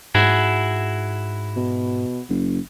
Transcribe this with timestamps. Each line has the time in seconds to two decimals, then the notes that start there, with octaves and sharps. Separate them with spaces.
0.15 G#2 E4 F#4 G#4
1.56 B2
2.29 F#1